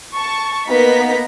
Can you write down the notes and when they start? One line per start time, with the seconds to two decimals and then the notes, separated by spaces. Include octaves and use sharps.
0.16 A5 C#6
0.69 A#3 B3 D#4 A#5 B6